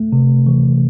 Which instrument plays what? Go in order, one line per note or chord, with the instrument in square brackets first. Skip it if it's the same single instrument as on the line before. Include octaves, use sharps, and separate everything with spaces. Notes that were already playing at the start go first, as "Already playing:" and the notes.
Already playing: [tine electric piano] A3
C3
E3